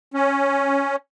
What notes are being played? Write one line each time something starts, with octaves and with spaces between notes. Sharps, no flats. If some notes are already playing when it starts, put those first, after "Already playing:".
C#4